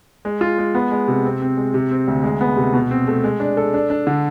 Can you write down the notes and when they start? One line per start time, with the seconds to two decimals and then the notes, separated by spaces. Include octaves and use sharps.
0.25 G#3
0.41 F4
0.58 G#3
0.75 B3
0.91 G#3
1.08 C3
1.25 C4
1.41 C4
1.57 G#3
1.74 C3
1.91 C4
2.08 D2
2.24 G#3
2.41 B3
2.57 C3
2.74 B2
2.91 C4
3.07 A3
3.24 G#3
3.40 D4
3.57 A4
3.74 D4
3.90 D4
4.07 D3